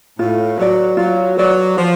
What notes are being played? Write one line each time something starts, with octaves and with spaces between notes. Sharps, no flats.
A2 F4
F#3 B4 D5
F#3 F4
F#3 B4 D5
F3 F4